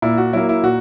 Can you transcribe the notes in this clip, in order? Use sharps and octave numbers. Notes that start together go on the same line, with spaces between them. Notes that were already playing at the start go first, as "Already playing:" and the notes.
A#2 E4
F#4
F#3 A#3 E4
E4
A#2 F#4